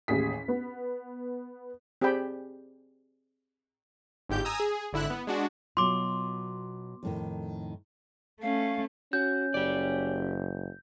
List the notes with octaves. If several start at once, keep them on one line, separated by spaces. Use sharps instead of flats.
A1 D#2 G#4 B6
B3
C4 G4 G#4 D5 G5 B5
G1 G#2 G4 G6
G#5 A#5 D#6 E6
G#4
G#1 D3 E4 E6 F#6
B3
G#3 D4 F#4
B2 F#3 F4 C6 D6
F2 A2 D#3
A3 C#4 F5
C#4 F#4 G6
F#1 G4 D5